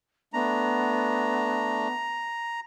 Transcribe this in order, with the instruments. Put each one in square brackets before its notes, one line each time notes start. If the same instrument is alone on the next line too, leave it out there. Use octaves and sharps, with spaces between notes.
[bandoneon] A3 D4 [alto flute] B3 [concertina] A#5